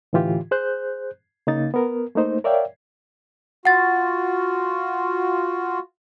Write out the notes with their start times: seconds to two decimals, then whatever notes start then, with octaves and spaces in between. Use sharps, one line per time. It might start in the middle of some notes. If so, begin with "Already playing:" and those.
0.13 A2 D3 E3 F4 G4
0.51 G#4 C5 F#6 G6
1.47 C#3 A#3 D#4 A6
1.74 B3 A#4
2.15 A3 A#3 D#4 C5
2.44 A#4 C#5 D5 E5 F5 G5
3.65 F4 F#4 F#5 A6